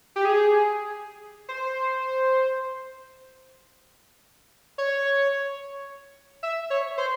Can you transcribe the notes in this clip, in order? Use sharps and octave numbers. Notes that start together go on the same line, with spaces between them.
G4
G#4
C5
C#5
E5
C#5
C5